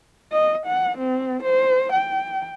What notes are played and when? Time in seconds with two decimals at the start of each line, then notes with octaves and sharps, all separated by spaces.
0.32 D#5
0.66 F#5
0.98 C4
1.43 C5
1.93 G5